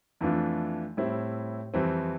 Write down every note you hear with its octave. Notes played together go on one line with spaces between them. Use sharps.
F2 E3 A3 D4 F4
A2 G3 C4 E4
F2 E3 G3 C4